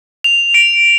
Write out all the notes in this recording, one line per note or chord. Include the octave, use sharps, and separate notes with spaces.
F7
D7